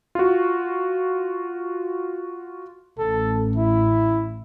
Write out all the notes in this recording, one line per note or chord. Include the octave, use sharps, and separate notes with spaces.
F4 F#4
A1 A4
E4